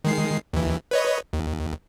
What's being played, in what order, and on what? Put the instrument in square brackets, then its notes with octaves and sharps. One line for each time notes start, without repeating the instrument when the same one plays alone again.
[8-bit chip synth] D#3 G#3 C7
D#2 E3
B4 C#5 D#5
D#2